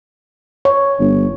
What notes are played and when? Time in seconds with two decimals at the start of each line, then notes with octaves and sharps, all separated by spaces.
0.65 C#5
1.00 G1